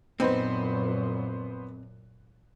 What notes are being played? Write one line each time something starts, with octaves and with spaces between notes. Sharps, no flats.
F#2 A#2 B3 C4 D#4 B4 C5